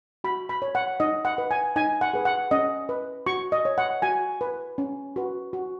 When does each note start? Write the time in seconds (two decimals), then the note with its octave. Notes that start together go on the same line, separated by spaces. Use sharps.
0.24 F#4 B5
0.49 B5
0.62 C#5
0.75 F#5
1.00 D#4 D#5
1.25 F#5
1.38 B4
1.51 G#5
1.76 D#4 G#5
2.01 F#5
2.14 G#4 B4
2.25 F#5
2.51 C#4 D#5
2.89 B4
3.26 F#4 C#6
3.52 D#5
3.65 C#5
3.78 F#5
4.02 F#4 G#5
4.41 B4
4.78 C#4
5.16 F#4 B4
5.53 F#4